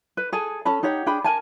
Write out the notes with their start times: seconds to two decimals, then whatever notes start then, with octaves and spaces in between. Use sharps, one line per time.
0.17 B4
0.33 G#4 A4 G#5
0.65 C#4 A4 A5 B5
0.83 D#4 G4 C#5 F#5
1.06 D4 G#4 G5 B5
1.24 A#4 G#5 A5